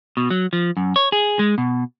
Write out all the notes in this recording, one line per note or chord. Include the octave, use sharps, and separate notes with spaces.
B2
F#3
F3
F#2
C#5
G#4
G#3
B2